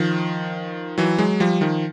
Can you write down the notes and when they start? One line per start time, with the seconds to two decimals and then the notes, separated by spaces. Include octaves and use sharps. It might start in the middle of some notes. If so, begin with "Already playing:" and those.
Already playing: D#3 F3
0.98 E3 F#3
1.18 F#3 G#3
1.40 F3 G3
1.61 D#3 F3